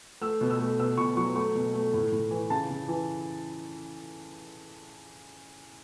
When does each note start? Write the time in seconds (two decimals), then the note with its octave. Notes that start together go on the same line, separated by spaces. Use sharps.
0.21 A3 E6
0.41 B2
0.50 E6
0.59 A3
0.79 B2 E6
0.97 B2 C#6
1.17 F#3 C#6
1.36 A3 C#6
1.55 B2
1.74 A3
1.94 A2
2.12 A2
2.31 E3
2.50 C#3 A5
2.70 C#3
2.88 E3